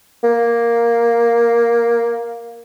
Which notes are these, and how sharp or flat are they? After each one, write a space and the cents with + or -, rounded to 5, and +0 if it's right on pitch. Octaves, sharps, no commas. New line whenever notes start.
A#3 +5